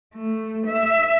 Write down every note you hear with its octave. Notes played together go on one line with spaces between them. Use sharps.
A3
E5